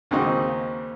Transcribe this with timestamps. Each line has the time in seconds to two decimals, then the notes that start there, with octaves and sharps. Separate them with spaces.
0.11 D#2 C#3 C4 D#4 F#4 D#5